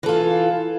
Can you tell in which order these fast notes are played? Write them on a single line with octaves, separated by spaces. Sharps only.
E3 A4 F4